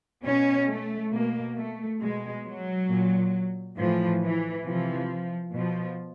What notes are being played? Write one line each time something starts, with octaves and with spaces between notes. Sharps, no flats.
B2 C#4
A3
B2 A#3
A3
B2 G#3
F#3
A#2
A2 E3 F3
E3
C3 E3 F3
B2 F3